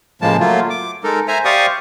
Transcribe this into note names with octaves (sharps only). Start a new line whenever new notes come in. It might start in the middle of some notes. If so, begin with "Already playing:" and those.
A2 C#3 F3 G#3 A#3 A5
F#3 A3 A#3 F4
D6
G#3 D#4 A4 A#4
C5 E5 G#5 A#5
G4 C5 D5 F5 C#6 D#6